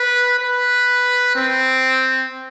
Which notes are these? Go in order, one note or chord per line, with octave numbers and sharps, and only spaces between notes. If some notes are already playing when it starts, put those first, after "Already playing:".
Already playing: B4
B4
C4